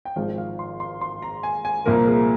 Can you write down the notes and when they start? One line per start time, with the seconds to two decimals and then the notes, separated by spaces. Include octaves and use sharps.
0.05 G5
0.16 G#1 G#2 F3 G#3 F5
0.38 F5
0.59 C6
0.80 C6
1.01 C6
1.22 A#5
1.43 G#5
1.65 G#5
1.86 C2 A#2 F3 A#3 A#4
2.07 G#4